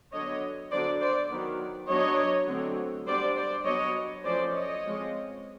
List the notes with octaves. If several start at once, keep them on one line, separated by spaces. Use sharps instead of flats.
D3 F#3 B3 D4 C#5 D#5
D3 F#3 B3 D4 C5 D5
C5 D5
D#3 F#3 B3
F#3 B3 D4 C#5 D#5
D3 F#3 A3 C4
G3 B3 D4 C5 D5
C5 D5
F#3 B3 D4 C#5 D#5
F3 A3 C#4 C5 D5
C#5 D#5
F3 G#3 C4